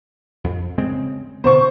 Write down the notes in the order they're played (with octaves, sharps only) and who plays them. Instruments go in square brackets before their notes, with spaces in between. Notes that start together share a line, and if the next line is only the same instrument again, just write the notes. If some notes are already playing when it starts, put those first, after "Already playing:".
[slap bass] F2
C#3 G#3 C4
[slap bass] B2 D3 B3 [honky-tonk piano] C5 C#6